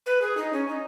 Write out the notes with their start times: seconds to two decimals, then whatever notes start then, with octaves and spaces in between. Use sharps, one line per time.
0.06 B4
0.22 G#4
0.37 D#4
0.53 C#4
0.68 D#4